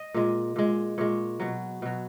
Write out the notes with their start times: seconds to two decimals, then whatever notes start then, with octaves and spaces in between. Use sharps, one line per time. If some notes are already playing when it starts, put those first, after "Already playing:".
Already playing: D#5
0.14 A#2 G#3
0.56 A#2 G#3
0.98 A#2 G#3 C#5
1.40 B2 F#3
1.82 B2 F#3